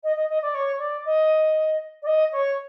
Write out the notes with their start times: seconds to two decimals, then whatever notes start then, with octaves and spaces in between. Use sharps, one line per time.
0.03 D#5
0.16 D#5
0.29 D#5
0.42 D5
0.54 C#5
0.79 D5
1.05 D#5
2.02 D5
2.06 D#5
2.32 C#5